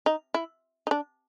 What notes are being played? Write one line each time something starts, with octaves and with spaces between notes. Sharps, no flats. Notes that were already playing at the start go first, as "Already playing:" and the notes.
D#4
E4
D#4
D4